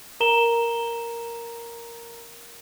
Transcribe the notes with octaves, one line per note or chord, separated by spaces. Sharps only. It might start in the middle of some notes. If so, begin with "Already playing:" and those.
A#4 A#5 E7 G7